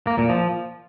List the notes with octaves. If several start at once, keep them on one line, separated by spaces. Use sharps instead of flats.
A#3
A#2
F3